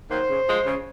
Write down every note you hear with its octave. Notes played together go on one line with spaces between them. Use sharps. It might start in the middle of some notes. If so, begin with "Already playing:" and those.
D#3 F#3 A#3 C5
C#3
F3 G#3
C#3